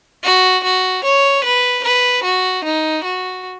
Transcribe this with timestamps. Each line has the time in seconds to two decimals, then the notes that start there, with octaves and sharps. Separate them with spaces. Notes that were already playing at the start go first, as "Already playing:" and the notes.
0.24 F#4
0.64 F#4
1.04 C#5
1.45 B4
1.84 B4
2.24 F#4
2.65 D#4
3.04 F#4